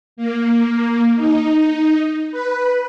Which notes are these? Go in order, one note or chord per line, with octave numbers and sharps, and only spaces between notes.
A#3
D#4
B4